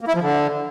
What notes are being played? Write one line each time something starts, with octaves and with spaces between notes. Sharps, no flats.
A#3
E4
F3
D3